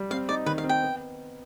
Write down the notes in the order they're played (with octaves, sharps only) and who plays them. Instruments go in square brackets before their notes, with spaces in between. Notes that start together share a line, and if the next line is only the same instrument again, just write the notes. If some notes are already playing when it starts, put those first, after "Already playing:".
Already playing: [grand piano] G3
[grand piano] C4 [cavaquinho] F5
[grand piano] D#4 [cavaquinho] D5
[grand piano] D#3 [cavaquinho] B4
[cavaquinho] F5
[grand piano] C4
[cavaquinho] G5
[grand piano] B3